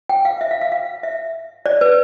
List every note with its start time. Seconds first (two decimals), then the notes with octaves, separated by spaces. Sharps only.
0.09 G5
0.25 F5
0.41 E5
0.51 F5
0.61 F5
0.72 F5
1.03 E5
1.66 D5
1.81 B4